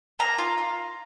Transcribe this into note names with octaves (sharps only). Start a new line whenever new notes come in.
A#3 A#5
F4
F4